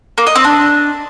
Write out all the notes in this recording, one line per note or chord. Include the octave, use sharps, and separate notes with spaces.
A#3
D#5
C4
D4